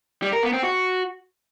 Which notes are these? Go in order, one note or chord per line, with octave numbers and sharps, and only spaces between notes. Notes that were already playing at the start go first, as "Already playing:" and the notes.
G3
A#4
B3
C4
F#4